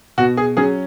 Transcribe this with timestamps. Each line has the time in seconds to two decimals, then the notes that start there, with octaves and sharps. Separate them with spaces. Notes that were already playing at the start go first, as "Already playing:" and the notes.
0.18 B2 F#4
0.37 G#4
0.57 F#3 C#4 G#4